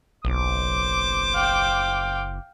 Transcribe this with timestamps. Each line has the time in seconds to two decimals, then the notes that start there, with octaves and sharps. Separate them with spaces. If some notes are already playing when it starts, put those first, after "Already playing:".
0.25 F#1 B1 C5 D6
1.34 F5 G5